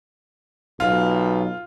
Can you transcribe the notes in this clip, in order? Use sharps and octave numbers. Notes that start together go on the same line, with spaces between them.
B1 F4